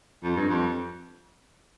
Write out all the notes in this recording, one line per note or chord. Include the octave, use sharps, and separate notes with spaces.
F2
G2
F2